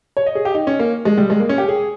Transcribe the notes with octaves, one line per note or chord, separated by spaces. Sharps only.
C#5
D#5
G#4
G4
D#4
C#4
A#3
G#3
G3
G#3
A#3
C#4
G4
G#4